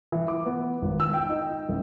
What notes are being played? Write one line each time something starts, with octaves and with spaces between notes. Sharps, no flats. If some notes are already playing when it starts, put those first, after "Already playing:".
E3
D6
B3
G#1
E6
G5
D#4
A1